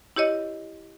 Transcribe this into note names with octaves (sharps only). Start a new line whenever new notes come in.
E4 G4 C#5 D#5